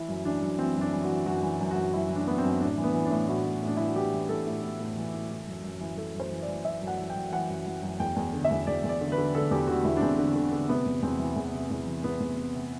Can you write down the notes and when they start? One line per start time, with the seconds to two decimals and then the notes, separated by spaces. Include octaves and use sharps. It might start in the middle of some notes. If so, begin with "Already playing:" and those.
Already playing: E3 E4
0.08 F#2
0.25 E3 D4
0.42 F#2
0.59 E3 C4
0.76 F#2 D4
0.93 E3
1.04 F#4
1.09 E3
1.26 F#2 F#4
1.43 E3
1.60 F#2
1.71 F#4
1.77 F#2
1.93 F#2 E4
2.10 E3
2.16 D4
2.27 E3 B3
2.38 C4
2.44 F#2
2.60 A2 D4
2.78 E3
2.84 B3
2.94 E3
3.05 D4
3.11 A2
3.28 A2 F#4
3.45 A2
3.63 A2 D4
3.77 E3 E4
3.86 F#4
3.96 E3 G4
4.13 E3
4.29 E3 A4
4.47 A2
4.63 A2
4.80 A2
4.97 E3
5.14 A2
5.30 E3
5.47 F#2
5.64 F#2
5.81 E3
5.97 E3 A4
6.15 F#2
6.20 C5
6.31 E3
6.42 D5
6.48 E3
6.65 F#2 E5
6.82 F#2
6.87 F#5
6.98 E3
7.10 G5
7.16 F#2
7.32 E3 F#5
7.49 F#2
7.66 E3
7.83 F#2
8.00 E2 G5
8.16 E2
8.33 D3
8.44 E5
8.50 E2
8.67 E2 D5
8.84 E2
8.89 D5
9.01 D3
9.12 B4
9.18 D3
9.35 D3 A4
9.51 E2 G4
9.67 D3 F#4
9.85 E2 E4
9.97 D4
10.01 E2 C4
10.19 D3
10.35 D3
10.53 D3
10.69 C3 B3
10.86 E2
11.03 E2 C4
11.19 E3
11.36 E2
11.54 C3
11.71 E2
11.87 E3
12.04 E2 B3
12.20 E2
12.37 C3
12.55 C3